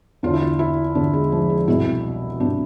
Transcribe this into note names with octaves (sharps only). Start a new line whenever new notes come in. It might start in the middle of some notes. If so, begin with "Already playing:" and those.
E2 D3 F4
E4
F4
E4
E2 D3 D4
G#3
F3
G#3
C2 B2 E4
C2 B2 D4